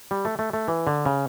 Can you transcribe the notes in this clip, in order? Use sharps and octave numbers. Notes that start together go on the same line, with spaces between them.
G3
A3
A3
A3
E3
D3
C#3